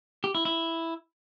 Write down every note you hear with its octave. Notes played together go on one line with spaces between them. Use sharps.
G4
E4
E4